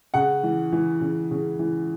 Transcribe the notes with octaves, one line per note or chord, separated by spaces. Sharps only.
C#3 F#5
E3
E3
C#3
C#3
E3